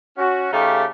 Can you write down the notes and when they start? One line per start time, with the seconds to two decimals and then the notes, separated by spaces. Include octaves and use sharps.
0.17 C#4 F#4
0.52 C#3 A3 D#4 G4 F5